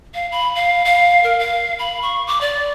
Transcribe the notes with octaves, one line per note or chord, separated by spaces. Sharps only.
F5
B5
F5
F5
A#4
F5
B5
C#6
D6
D5